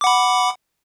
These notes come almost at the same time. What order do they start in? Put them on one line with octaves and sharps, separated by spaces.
D6 F#5 B5